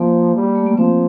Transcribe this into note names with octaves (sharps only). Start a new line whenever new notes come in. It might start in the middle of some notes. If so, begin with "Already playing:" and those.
Already playing: F3 A#3
G3
A3
A#3
F3 C4